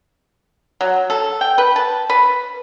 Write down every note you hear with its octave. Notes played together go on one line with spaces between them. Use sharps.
F#3
A4
G5
B4
A5
B4